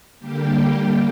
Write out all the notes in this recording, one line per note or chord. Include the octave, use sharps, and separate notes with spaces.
D3 G3 A#3 G4
G4